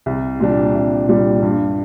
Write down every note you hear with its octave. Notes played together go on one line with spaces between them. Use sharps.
C2
A#2 G3 D4
C2
A#2 G3 D4
G2